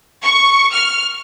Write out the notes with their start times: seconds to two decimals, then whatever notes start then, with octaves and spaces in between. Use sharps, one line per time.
0.23 C#6
0.73 F6